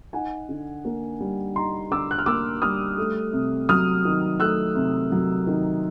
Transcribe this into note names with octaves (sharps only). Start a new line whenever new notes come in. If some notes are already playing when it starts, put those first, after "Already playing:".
D#4 F#5 G#5
D3
A#3
G3
D#4 A#5 C6
D3 D6 E6
F#6
F6
A#3 D6 E6
G3 D#6 F6
A3
C3
F#3 D#6 F6
D#3
A3 E6 F#6
C3
F#3
D#3